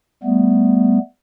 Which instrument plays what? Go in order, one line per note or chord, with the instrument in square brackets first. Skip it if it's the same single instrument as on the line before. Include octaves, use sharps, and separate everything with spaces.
[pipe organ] G3 A3 B3